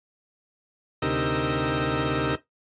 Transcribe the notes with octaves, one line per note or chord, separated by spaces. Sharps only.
D2 C3 D#4 G4 A#4 E6